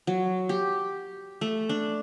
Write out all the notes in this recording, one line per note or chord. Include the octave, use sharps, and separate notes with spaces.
F#3
G4
A3
D4